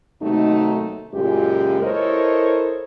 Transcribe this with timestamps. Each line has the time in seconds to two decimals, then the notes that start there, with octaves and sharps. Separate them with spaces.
0.22 D#2 C3 F#3 A3 D#4
1.14 F#2 A#2 C#3 G#3 F4 G4
1.82 E4 A4 A#4 C5 C#5 D#5